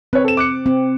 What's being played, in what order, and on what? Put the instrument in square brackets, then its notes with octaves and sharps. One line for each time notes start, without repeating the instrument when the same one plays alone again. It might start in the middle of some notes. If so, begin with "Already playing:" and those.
[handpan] C4 [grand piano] B4 C#5
[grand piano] A4 E7
D6 F#6 C#7
[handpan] C4